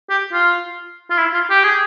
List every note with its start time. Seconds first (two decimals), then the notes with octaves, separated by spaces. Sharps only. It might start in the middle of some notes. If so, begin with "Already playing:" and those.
0.10 G4
0.33 F4
1.10 F4
1.18 E4
1.34 F4
1.50 G4
1.64 G#4